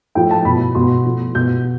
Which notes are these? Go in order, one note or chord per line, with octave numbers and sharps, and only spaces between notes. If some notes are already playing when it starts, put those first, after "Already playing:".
A2 F3 G5
A5
B2 B5
B2 C6
A2 F3
B2 G6